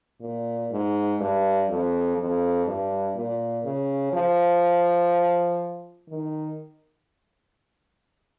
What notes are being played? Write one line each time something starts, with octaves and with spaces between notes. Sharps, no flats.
A#2
G#2
G2
F2
F2
G2
A#2
C#3
F3
D#3